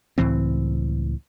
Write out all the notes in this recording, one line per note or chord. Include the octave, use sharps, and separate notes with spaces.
C#2 A2 E3 C4